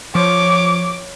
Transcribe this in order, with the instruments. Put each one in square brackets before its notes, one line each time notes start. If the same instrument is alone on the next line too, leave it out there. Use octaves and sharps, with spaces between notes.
[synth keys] F3 [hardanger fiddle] C#5 [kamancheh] D6